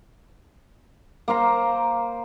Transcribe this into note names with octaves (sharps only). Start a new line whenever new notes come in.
A#3 C5 F5 A#5